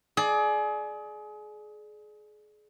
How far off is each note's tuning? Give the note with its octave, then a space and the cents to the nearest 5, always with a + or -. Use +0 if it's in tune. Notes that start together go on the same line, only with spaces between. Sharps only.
G#4 +30 D5 +15